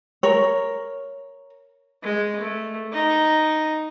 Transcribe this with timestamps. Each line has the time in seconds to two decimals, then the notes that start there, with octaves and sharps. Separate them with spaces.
0.23 A#4 C#5
2.03 G#3
2.40 A3
2.93 D#4